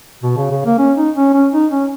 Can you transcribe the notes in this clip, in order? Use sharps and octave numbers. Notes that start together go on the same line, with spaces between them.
B2
C#3
C#3
A#3
C#4
D#4
C#4
C#4
D#4
C#4